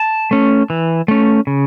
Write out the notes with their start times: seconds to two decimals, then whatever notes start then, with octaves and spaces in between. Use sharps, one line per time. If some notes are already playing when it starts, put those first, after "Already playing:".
Already playing: A5
0.31 A3 C#4
0.70 E3
1.08 A3 C#4
1.47 C#3